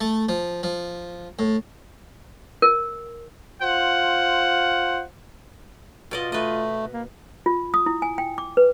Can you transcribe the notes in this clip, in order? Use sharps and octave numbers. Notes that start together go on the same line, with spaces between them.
A3
F3
F3
A2
A#4
F4 C5 F#5
B2 F4 D5 D#5
A3 B4 D#5
A#3
F4
D#6
E4
G#5
G5
D6
B4